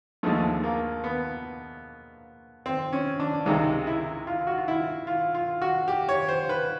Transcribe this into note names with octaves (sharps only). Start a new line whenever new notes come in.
D#2 D3 F3 G#3 A3
A#3
B3
C4
C#4
D4
C#2 C3 D#3 G#3 D#4
E4
F4
F#4
F4
E4
F4
F4
F#4
G4
C#5
C5
B4